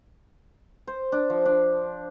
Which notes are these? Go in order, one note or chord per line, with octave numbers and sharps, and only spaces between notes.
C5
D4
F3
D4